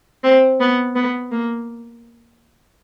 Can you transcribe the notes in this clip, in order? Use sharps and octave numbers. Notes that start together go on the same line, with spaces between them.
C4
B3
B3
A#3